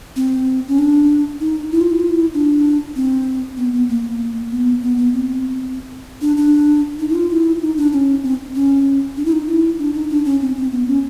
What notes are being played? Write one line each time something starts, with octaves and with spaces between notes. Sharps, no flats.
C4
C#4
D4
D#4
E4
F4
E4
F4
E4
D4
C4
B3
B3
A#3
B3
B3
B3
C4
D4
D4
D#4
E4
F4
E4
D#4
D4
C#4
C4
C#4
D4
E4
D#4
E4
D4
D#4
D4
C#4
C4
C4
B3
C#4